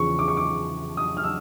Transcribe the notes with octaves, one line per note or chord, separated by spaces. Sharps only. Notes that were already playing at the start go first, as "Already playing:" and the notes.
Already playing: E2 C#3 F3 C#6
D6
C#6
D6
D#6
F6
E6